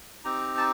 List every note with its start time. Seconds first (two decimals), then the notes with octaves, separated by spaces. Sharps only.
0.24 C4 D#4 G4 A#5
0.58 A5